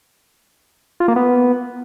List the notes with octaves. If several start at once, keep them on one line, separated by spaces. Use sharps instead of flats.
F4
A#3
B3